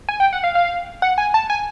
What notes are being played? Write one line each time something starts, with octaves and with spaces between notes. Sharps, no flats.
G#5
G5
F#5
F5
F5
F#5
G#5
A5
G#5